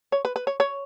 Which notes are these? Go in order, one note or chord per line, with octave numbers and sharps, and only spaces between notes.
C#5
B4
B4
C#5
C#5